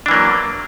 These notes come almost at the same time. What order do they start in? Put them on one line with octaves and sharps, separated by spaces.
D4 E3 A#3 F#3